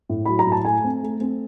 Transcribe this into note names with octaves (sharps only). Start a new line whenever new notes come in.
A2
F#3 B5
A#5
A2
A5
A3 G#5
C4
A3
C4